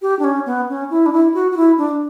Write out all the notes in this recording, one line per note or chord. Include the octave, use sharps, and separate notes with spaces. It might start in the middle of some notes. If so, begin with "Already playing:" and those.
G4
D4
C#4
B3
C#4
E4
D4
E4
F#4
F#4
E4
D4